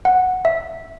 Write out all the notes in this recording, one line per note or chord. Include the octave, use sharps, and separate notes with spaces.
F#5
E5